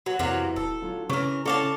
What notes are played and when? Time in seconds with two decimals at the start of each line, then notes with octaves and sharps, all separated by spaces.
0.06 F#3 F#4
0.19 F2 C3 E3 F#3 A#3
0.56 D#1 A4
0.82 D3 F#3 F4
1.10 C#3 E3 C#4 A#4 C#6
1.46 C#4 E4 A4 D5 F5 A5 C#6 D6